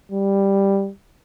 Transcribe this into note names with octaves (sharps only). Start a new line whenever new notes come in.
G3